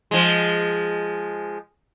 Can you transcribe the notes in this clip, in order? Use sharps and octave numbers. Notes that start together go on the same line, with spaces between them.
F3 G#3